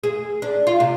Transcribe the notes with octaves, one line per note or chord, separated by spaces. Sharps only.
G#4
D4
F4
C3